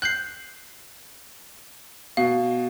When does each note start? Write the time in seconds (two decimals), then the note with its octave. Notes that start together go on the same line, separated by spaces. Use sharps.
0.02 F#6 G6 C7 F#7
2.17 B2 F5